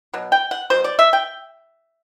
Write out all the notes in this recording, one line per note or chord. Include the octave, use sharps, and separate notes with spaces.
B2 F#3
G5
F#5
B2 F#3 C5
D5
E5
G5